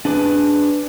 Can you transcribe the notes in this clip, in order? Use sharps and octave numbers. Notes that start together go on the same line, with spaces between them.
D4 G#4 B4 D6